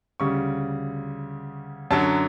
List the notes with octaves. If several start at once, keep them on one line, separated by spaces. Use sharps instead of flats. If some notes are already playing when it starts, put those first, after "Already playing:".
D2 C#3 G3 C#6
F#2 D3 F#3 A5